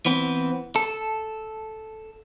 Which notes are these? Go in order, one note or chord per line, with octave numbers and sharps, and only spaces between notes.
E3 B3 C4
A4